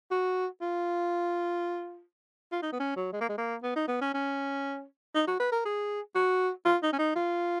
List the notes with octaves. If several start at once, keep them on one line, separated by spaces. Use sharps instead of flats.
F#4
F4
F4
D#4
B3
C#4
F#3
G#3
A#3
G#3
A#3
B3
D#4
B3
C#4
C#4
D#4
F#4
B4
A#4
G#4
F#4
F4
D#4
C#4
D#4
F4